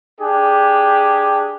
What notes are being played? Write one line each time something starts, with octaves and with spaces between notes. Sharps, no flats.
D4 G4 G#4